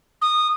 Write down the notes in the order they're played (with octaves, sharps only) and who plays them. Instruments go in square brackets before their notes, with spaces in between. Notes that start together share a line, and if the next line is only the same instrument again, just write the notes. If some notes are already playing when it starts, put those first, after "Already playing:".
[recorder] D#6